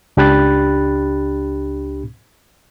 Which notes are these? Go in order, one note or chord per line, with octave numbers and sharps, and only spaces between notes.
C#2 D4 G4 B5 F#6 A6